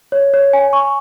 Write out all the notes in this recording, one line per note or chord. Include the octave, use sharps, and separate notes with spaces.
C#5
C#5
G#5
C#6